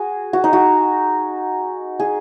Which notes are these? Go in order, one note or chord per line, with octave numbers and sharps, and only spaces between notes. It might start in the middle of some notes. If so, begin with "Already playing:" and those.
Already playing: F#4 G#4
F#4
D#4
F#4
G#4